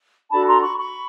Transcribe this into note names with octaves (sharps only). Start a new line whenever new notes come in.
D4 F#4 A4 A5 B5
A#5 C6
B5 C#6
B5 C#6